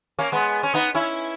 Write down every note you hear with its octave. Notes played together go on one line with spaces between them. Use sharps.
A#3 C#4
G#3 B3
C#4
B3 D#4
C#4 E4